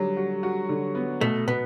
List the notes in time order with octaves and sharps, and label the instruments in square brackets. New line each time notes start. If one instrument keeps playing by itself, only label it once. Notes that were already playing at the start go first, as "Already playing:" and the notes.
Already playing: [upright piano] D3 F#3 [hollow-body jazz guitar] G3
[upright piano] F#4
F#4
D3
B3
[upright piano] B2 [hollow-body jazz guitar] A3
[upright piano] B2 [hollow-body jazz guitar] B3